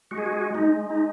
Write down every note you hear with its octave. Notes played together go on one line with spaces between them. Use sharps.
G#3 F#4
G#4
F#4
G#4
F#4
G#3 D#4
D#4